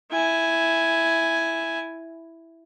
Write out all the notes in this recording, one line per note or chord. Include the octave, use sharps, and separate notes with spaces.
E4 G#5